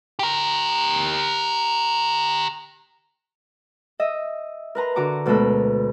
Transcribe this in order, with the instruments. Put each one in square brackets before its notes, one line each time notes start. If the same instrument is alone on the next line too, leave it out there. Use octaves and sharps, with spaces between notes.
[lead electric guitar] G4 A#4
[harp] D#5 E5
A#4 B4 A#5 C6
D3 F#4 A#5 D6
D2 B2 G#3 A4 A#4 B5